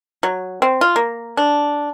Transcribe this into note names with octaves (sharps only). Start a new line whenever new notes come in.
F#3
C4
F4
A#3
D4